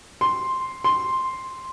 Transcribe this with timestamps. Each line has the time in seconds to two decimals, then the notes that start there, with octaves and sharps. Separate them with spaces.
0.21 C6
0.84 C6